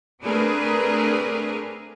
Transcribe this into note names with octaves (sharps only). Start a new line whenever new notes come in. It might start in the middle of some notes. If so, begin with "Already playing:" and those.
A3 C4 D4 G#4 A#4 B4